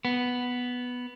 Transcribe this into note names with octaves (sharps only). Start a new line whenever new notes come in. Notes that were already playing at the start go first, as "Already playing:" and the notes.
B3